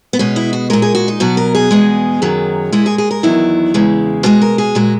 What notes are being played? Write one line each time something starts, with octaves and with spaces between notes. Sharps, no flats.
B3
B2 G#3 C#4
E4
F#4
A#2 G#3 A#4
G#4
F#4
D#4
B2 F#3 F#4
A#4
G#4
E2 B2 G#3
F#2 D#3 F#3
A#2 G#3 E4
G#4
G#4
A#4
E2 D#3 F#3 E4
E2 C#3 G#3
B2 G#3 F#4
A#4
G#4
A#2 G#3 F#4